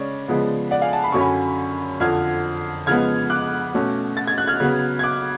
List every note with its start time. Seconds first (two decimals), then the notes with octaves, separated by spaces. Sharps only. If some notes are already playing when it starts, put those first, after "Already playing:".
Already playing: C#3 G#3 C#4 C#5 D5
0.28 C#3 F3 G#3 B3
0.71 D5 F#5
0.82 F5 G#5
0.93 F#5 A5
1.04 B5
1.12 F#2 D3 F#3 C#4 C#6
1.20 G#5 B5
2.00 F2 D3 F3 F6 G#6
2.87 C#3 F3 G#3 B3 F6 G#6
3.30 D6 F#6
3.74 B2 A3 C#4
4.17 A6
4.27 G#6
4.38 F#6
4.47 F6 G#6
4.60 C#3 F#3 B3
4.99 G#6
5.03 D6 F#6